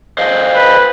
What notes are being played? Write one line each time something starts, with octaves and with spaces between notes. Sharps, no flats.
C5 D#5 F5
B4